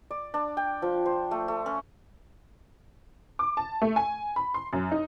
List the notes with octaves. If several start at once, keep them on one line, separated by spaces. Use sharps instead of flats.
D5
D4
G5
F3
C5
A3
A3
C#4
D6
A5
A3
G#5
B5
C6
F#2
D#4